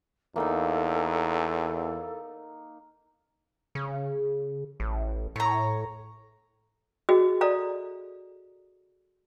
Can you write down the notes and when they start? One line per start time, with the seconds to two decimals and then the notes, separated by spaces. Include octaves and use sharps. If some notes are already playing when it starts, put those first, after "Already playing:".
0.36 E2 A#3 D#4 A4
3.75 C#3
4.80 A1
5.36 A2 C#5 A#5
7.09 F#4 G#4 D#5
7.41 A4 D5 D#5 F5 A#5